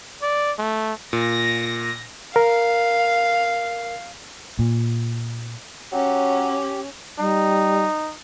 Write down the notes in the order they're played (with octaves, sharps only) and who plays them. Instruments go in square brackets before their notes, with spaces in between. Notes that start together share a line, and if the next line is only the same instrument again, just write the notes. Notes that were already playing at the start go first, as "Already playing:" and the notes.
[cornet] D5
A3
[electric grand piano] A#2 [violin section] A#6
[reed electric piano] A#4 [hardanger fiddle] F5
[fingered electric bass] A#2
[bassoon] F#3 [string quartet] C#4 [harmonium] G4
[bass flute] G3 [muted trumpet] D#4